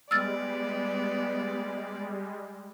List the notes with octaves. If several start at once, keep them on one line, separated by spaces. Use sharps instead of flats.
G3 G#3 B3 D5 E6 F6 A6